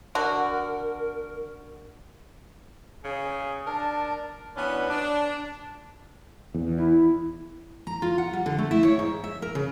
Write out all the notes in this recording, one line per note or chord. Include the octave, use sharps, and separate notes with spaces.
D3 F#4 A#4
C#3 G#4
D4 A#4 A5
E3 B3 C#4 D4 F#4 B4
D4
E2
E4
A#5
F4
F#5
G3
D3
A3
E4
C#5
G#2
E5
A#4
C#3